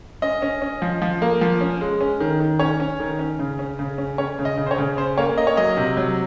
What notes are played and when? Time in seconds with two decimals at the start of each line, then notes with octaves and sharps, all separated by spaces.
0.22 C#4 D#5
0.42 C#4
0.62 C#4
0.82 F3
1.02 F3
1.22 A#3
1.41 F3
1.61 C#4
1.81 G#3
2.01 C#4
2.20 D#3
2.40 D#3
2.59 C#4 C#5
2.80 C#4
3.00 D#3
3.19 C#4
3.39 C#3
3.59 C#4
3.79 C#3
3.98 C#4
4.18 C#4 C#5
4.39 C#3
4.45 D#5
4.57 C#3
4.66 C5
4.71 C#5
4.78 C#3
4.97 C#4 C5
5.18 A#3 C#5
5.37 A#3 D#5
5.47 C#5
5.57 F#3 D#5
5.77 C3
5.97 F#3